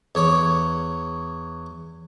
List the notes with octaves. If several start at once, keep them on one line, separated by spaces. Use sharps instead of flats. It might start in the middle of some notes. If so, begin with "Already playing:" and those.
E2 C#5 D6